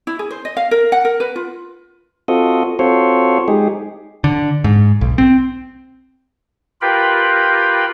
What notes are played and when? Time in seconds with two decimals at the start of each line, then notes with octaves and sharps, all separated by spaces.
0.07 E4
0.19 G#4
0.31 C5
0.45 D#5
0.57 F5
0.71 A#4
0.92 F#5
1.05 A#4
1.20 B4
1.36 F4
2.28 C4 F4 F#4 A4 D#5
2.79 C4 F4 F#4 A4 C5 C#5
3.48 G#3 D#4 G4 G#4
4.24 D3
4.64 G#2
5.01 B1
5.18 C4
6.81 F4 G4 A#4 B4 G5 B5